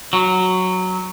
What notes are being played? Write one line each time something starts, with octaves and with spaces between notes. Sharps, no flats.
F#3